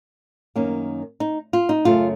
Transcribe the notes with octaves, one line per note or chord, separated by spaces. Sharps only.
F#2 D#3 A#3 C#4
D#4
F4
D#4
F#2 C#3 A3 C#4 F4